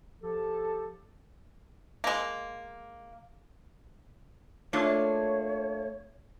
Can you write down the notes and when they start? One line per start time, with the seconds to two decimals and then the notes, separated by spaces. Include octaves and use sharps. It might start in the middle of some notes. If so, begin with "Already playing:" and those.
0.22 F3 G4 A4
2.04 G#3 A#3
4.73 A3 A#3 D4 F4 C#5